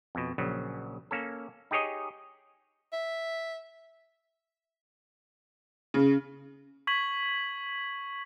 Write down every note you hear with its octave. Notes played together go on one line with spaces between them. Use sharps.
F2 B2
A#1 C#3 F#3
A#3 C#4 A4
D#4 G4 G#4 C#5 D#5
E5
C#3
C#6 G#6 B6 F#7